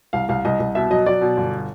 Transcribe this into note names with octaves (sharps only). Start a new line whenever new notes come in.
C2 F5
C2 F5
C2 D#5
C2
B2 E5
F#3 D#5
F#3 D5
B2
G1